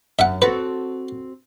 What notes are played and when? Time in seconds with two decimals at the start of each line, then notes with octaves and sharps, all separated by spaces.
0.19 F#2 E5 F#5
0.42 C4 F#4 A4 B4